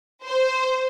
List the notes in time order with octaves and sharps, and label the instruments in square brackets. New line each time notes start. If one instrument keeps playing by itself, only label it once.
[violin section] C5